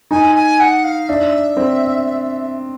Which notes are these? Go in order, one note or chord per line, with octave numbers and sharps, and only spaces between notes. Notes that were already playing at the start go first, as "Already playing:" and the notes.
D#4 G#5
G#5
F#5
F5
D4 E5
C4